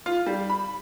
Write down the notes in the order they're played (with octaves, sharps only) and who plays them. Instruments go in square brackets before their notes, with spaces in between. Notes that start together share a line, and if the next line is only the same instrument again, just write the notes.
[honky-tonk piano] F4
G3
B5